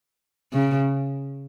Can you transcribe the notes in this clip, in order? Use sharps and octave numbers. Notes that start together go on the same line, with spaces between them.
C#3